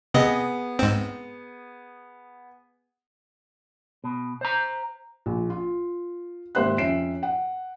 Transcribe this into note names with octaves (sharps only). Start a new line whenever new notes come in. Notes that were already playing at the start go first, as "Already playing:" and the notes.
C3 B3 G#4 D#5
G#2 C4
B2
C5 A#5
A#1
F4
G#1 A#3 G4 C5 E5 F#6
F2 C#4 E5 C7 D7 E7
F#5